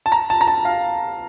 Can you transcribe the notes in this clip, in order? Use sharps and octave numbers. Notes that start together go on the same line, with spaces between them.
A5
A#5
A5
A#5
A5
F5